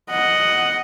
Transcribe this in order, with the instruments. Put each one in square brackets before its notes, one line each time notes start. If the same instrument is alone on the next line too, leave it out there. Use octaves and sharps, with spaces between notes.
[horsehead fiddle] D#5 F#5